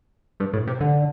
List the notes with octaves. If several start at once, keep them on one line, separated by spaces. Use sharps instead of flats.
G2
A2
C3
D3